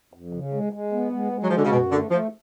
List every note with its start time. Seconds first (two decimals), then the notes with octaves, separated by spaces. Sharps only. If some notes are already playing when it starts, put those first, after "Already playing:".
0.13 F2
0.33 C#3
0.53 G#3
0.73 G#3
0.92 B3
1.12 G#3
1.32 G#3
1.42 F#3
1.49 F3
1.52 D3 F#4
1.64 C#3
1.71 F#2 B2
1.91 D3 A3
2.11 F3 A3